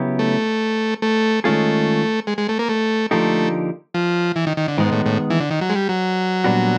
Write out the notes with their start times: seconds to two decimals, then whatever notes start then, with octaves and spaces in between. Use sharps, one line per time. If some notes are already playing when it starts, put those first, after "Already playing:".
Already playing: C#3 F#3 B3 E4 G4
0.19 A3
1.02 A3
1.44 D#3 G#3 A3 C#4 F4 G#4
2.27 G#3
2.38 G#3
2.49 A3
2.59 A#3
2.69 A3
3.11 D3 F3 A3 A#3 D#4 G4
3.94 F3
4.36 E3
4.47 D#3
4.57 D#3
4.68 D3
4.78 G#2 D#3 G#3 B3
4.92 A2
5.06 A2
5.30 E3
5.40 D3
5.51 D#3
5.61 F#3
5.69 G#3
5.75 G3
5.89 F#3
6.44 A#2 G3 B3 D4 F#4